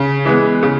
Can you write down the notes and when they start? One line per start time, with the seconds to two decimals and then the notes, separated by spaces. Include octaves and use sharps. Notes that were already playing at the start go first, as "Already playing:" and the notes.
Already playing: C#3
0.25 E3 G#3 B3
0.63 C#3